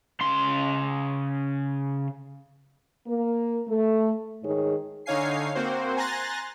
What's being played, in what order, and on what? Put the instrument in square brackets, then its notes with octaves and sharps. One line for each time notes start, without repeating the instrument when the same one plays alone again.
[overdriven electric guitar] C#3 C6
[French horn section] A#3 A#4
A3
G#2 D#3 G#4 C#5
[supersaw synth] D3 D#4 C#5 F5 G#5 C7
A#3 C4 F#4 C5
G#5 A#5 C6 F#6 A6 A#6